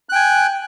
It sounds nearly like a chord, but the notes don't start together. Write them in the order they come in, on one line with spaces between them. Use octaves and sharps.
F#6 G5 G#5